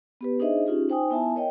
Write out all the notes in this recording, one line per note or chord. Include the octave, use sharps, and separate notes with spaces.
B3 G4 B4
D4 D#4 G#4 C5 D#5 E5
C#4 D#4 F4 G4 G#4
D#4 C5 G5 G#5 D#6
B3 E4 E5 G#5 A5
A#4 C#5 D#5 G5